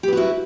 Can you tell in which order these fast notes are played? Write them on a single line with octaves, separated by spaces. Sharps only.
G4 B4 F#4 E4